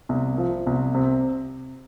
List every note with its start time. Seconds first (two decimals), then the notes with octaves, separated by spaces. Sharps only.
0.09 C2
0.38 F3
0.67 C2
0.94 C3